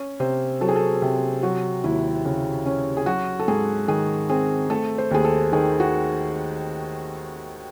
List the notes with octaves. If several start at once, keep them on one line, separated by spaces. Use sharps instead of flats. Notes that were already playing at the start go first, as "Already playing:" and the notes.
Already playing: C#4
C3 C5
F#3 A4
G#4
A4
C3
F#3 F#4
D#2 E4
C#3
C#4
G#4
F#3 F#4
A4
G#2 G#4
D#3 G#4
C4 G#4
A3 A4
C5
D#2 G#4
A4
D#3 G#4
F#4